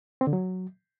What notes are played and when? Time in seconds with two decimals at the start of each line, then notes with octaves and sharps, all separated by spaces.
0.21 C4
0.27 D3
0.33 F#3